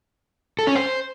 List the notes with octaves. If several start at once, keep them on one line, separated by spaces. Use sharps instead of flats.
A4
C#4
C5